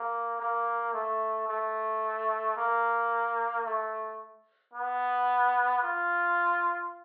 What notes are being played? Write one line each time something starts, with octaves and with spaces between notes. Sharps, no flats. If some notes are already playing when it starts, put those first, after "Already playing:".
Already playing: A#3
A#3
A3
A3
A#3
A3
B3
F4